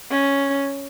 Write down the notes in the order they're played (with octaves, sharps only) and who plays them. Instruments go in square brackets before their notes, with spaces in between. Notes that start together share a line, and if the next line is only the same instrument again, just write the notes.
[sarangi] C#4